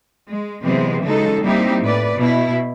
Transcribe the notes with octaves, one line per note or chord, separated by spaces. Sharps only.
G#3
C3 E3 F#3 G#3 B3 C4
C#3 F#3 G#3 D#4 A4
G3 A#3 C4 D#4 E4 G4
A2 B4 D5
B2 E4